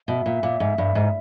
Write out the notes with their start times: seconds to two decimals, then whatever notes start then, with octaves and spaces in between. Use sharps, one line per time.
0.08 B2 E5
0.26 A#2
0.43 A#2
0.60 G#2
0.78 G2
0.95 G#2